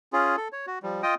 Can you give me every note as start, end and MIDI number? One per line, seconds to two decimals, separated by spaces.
0.13 0.36 61
0.13 0.36 65
0.13 0.36 68
0.37 0.48 69
0.52 0.66 73
0.67 0.79 66
0.83 1.02 53
0.83 1.02 55
1.03 1.15 65
1.03 1.15 75
1.03 1.15 79
1.03 1.15 87